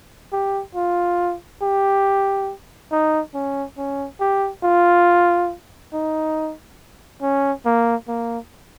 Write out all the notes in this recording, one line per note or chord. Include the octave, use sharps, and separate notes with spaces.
G4
F4
G4
D#4
C#4
C#4
G4
F4
D#4
C#4
A#3
A#3